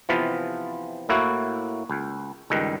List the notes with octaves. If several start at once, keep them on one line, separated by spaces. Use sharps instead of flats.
C3 E3 F3 B3 F4
A2 A#3 E4 F#4
C#2
C#2 G2 D#3